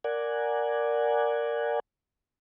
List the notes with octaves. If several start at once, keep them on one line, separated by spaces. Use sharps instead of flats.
A#4 D5 F#5 G#5